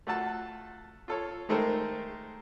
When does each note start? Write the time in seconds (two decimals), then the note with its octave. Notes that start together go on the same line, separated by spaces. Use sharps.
0.07 A3 F4 F#4 A4 F#5 A5
1.08 F4 A4 C#5
1.49 D#3 G#3 A3 A4 A#4 C5